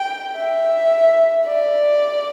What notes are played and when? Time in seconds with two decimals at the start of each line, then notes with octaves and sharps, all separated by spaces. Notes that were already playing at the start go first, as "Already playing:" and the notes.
Already playing: G5
0.37 E5
1.45 D5